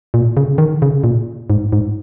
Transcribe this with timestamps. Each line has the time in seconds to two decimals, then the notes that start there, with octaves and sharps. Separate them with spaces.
0.14 A#2
0.37 C#3
0.58 D#3
0.82 C#3
1.04 A#2
1.50 G#2
1.72 G#2